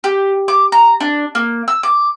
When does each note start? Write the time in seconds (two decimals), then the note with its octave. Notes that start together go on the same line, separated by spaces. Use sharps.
0.04 G4
0.48 D6
0.72 A#5
1.00 D4
1.35 A#3
1.68 E6
1.83 D6